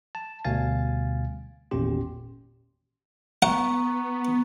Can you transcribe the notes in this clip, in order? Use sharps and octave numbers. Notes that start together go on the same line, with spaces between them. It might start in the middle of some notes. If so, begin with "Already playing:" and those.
A5
D2 B2 G3 F5 G#5 A6
G#1 E2 A#2 C#4 G4 C6
B3 F#5 A#5 C#6